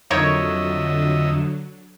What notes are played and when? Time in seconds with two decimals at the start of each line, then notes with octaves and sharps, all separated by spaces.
0.11 F2 D3 F#3 D#4 A#4 C#5 D#5 E5